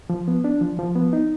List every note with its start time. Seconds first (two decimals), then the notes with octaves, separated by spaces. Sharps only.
0.10 F3
0.28 B3
0.44 D4
0.61 F3
0.79 F3
0.95 B3
1.13 D#4